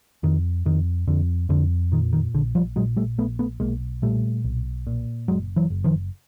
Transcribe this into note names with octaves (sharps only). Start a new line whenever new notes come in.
F2 D#3
F2 D#3
F2 D3
F2 D3
A#2 D#3
D#3
A#1 D3
F3 G3
A#2 F#3 G#3
G3 A3
A#1 A3 B3
A3 B3
B1 G#3 A#3
A#2 G3 A3
B1
A#2
F#1 F#3 G#3
E3 F#3
F#1
D#3 F3